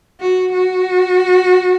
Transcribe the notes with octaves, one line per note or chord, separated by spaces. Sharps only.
F#4
F#4